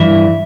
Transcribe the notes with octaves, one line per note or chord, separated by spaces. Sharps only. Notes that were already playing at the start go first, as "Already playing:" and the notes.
Already playing: G2 E3 E5